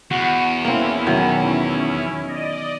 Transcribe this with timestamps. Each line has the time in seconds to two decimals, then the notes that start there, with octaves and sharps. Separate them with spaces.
0.11 E2 F#4
0.65 A#3 C4 C#4 E4
1.07 B2 D#3 F#3
2.24 D5 D#5